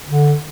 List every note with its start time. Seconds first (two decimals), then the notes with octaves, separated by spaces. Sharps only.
0.07 D3